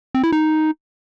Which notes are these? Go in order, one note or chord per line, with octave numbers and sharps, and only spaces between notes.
C4
E4
D#4